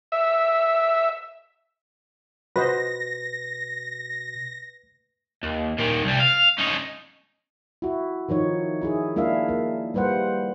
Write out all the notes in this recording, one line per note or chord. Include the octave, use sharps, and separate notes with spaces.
E5
B2 F#4 B4 C5 D#5 A#6
D#2
A#2 D#3
C2 G3
F5
C#4 D#4
E4 F#4
D#3 F3 D#4 C#5
D#4 E4 G#4
G#3 A#3 D4 E4 E5 F5
A#3
G3 A#3 B4 C5 F#5